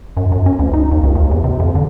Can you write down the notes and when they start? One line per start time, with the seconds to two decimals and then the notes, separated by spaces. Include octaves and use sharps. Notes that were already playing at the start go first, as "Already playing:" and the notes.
0.17 F#2
0.32 F#2
0.46 C#4
0.59 D2
0.74 D#4
0.91 D#2
1.03 C#2
1.15 D#2
1.31 E2
1.44 C3
1.60 F2
1.75 D3